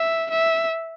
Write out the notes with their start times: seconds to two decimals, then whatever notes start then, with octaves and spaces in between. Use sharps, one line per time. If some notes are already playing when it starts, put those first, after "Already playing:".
Already playing: E5
0.30 E5